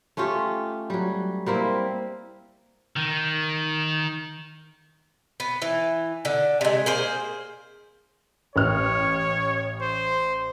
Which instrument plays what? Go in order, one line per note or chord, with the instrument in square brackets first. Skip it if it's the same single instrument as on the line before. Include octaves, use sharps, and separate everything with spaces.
[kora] A3 C#4 F4 G4
F#3 G3
G3 A#3 C4 E4
[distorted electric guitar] D#3
[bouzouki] B3
E3
D3
C3 G#3
A#3 G#4 C5
[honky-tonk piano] A1 F6 [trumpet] C#5
[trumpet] C5